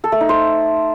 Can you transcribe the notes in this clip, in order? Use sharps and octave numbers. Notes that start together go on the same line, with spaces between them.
A4
A3
D#4
C5